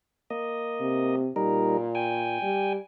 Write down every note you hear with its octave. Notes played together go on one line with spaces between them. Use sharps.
A#3 D#5
C3
A#2 G3 D#4 A#4
G5 G#5
G3